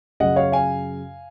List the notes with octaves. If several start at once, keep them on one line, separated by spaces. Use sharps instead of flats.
F#2 C#3 D#5 F#5
C#5 F5
F5 G#5